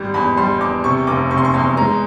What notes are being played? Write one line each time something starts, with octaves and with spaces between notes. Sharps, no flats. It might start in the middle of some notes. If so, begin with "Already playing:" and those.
Already playing: G#1 G3
E2 B5
G3 C6
E2 D6
C3 C#6
F1 D6
C3 C#6
C6
C#6
E2 C6
G#3 A#5